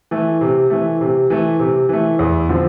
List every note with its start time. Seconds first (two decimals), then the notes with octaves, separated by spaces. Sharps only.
0.11 E3 A3
0.41 C3
0.70 E3 A3
1.01 C3
1.30 E3 A3
1.59 C3
1.89 E3 A3
2.19 E2
2.49 D3 F3 C4